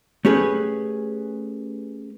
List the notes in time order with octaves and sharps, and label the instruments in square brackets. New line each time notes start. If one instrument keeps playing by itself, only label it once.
[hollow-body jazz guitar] A3 C#4 G4 G#4 B4